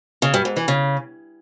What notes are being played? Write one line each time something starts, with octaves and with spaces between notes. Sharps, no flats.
C#3
G2
G#2
E3
C#3